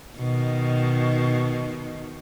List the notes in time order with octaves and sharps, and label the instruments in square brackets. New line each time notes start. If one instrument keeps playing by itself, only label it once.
[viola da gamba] B2 D#3